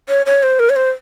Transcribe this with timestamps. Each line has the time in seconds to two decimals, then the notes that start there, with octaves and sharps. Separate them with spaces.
0.09 C#5
0.26 C#5
0.43 C5
0.59 A#4
0.70 C#5
0.76 C5